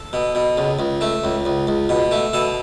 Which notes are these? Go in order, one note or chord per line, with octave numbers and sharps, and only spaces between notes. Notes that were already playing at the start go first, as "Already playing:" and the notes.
Already playing: A4
B2
B2
C#2
C#2
A3
C#2
C#2
C#2
B2
A3
B2 A4